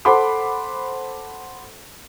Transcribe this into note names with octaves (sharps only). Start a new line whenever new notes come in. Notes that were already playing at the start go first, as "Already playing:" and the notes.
A4 C5 F#5 B5 C6 D6